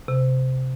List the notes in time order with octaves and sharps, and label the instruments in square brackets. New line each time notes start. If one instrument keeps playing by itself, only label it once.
[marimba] C3